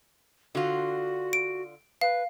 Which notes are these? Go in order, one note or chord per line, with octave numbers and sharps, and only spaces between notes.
D3 F4 F#4
D7
B4 F5